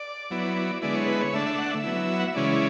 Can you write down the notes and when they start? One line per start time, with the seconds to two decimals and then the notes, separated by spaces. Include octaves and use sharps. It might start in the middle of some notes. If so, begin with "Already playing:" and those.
Already playing: D5
0.31 F#3 B3 E4
0.82 D3 G#3 B3 E4 D5
0.95 C#5
1.08 B4
1.21 C#5
1.33 D3 A3 D4 E5
1.46 E5
1.58 F#5
1.71 E5
1.84 F#3 B3 E4
2.20 F#5
2.27 E5
2.35 C#3 E3 G#3 C#4 E4 D5